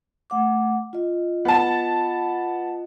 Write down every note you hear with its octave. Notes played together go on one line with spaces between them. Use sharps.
A3 F#5 D6
F4 D#5
B3 A5